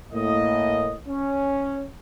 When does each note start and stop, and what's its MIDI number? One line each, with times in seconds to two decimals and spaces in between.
0.13 0.94 45
0.13 0.94 58
0.13 0.94 75
1.07 1.86 61